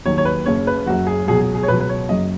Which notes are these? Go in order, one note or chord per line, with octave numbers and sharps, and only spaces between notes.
D#2 D#3 F#3 C#5
C#5
B4
F#1 F#2 C#3 C#5
B4
F#1 F#2 F#3 F#4
G#4
C#2 B2 F#3 G#4
G#4
G#4
C#5
C#2 B2 F#3 B4
B4
C#5
F#1 F#2 F#3 D#5